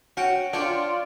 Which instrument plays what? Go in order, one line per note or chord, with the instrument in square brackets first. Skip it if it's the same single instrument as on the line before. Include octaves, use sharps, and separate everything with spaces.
[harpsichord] C#4 F#5 G5 [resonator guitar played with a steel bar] F#4
[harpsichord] D4 C#5 G5 [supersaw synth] F4 [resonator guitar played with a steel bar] D5